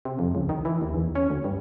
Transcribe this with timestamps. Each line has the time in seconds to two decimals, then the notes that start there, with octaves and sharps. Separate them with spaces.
0.05 C3
0.19 F2
0.35 C#2
0.49 D#3
0.65 E3
0.81 D#2
0.94 E2
1.15 C#4
1.30 D2
1.44 G2